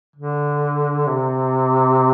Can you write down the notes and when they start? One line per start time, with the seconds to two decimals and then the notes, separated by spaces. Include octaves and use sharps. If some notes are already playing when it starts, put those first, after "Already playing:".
0.16 D3
1.07 C3